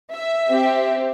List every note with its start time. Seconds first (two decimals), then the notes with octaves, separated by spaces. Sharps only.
0.12 E5
0.49 C4 G4